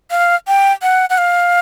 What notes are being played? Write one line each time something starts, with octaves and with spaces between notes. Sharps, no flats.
F5
G5
F#5
F#5
F5